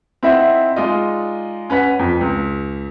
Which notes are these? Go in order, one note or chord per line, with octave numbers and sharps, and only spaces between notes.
C4 D#4 E4 E5 F#5
G#3 D#4 F4 D5 D#5
C#4 B4 F#5 B6
F2
C#2